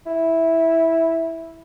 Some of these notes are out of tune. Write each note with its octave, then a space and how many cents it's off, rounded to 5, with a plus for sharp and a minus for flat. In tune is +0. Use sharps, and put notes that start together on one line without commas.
E4 -5